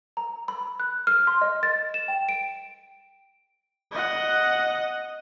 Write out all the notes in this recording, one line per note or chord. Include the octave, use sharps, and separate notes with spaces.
A#5
B5
F#6
F6
C6
D#5
A6
E7
G5
D7
D#5 F#5